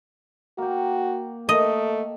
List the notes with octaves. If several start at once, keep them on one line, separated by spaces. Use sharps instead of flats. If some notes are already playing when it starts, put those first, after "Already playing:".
A#3 F#4 G5
A3 D#5